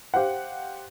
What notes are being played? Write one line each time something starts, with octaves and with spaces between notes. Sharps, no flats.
G4 C5 F5 F#5